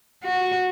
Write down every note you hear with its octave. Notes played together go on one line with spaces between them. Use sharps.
F#4